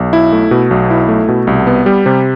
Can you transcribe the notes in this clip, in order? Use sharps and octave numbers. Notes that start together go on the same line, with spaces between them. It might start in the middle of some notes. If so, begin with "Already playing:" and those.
Already playing: B1
E4
A3
B2
B1
E4
A3
B2
C2
B3
G3
C3